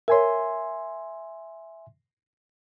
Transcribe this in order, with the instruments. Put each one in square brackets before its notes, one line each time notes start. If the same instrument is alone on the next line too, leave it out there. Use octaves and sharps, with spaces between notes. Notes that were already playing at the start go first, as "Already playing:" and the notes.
[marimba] A#4 C#5 [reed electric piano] E5 G#5 C6